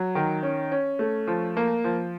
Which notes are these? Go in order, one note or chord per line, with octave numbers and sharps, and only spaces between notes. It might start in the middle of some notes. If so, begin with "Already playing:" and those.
Already playing: F#3
D#3
C#4
C#4
A3
F3
A#3
F3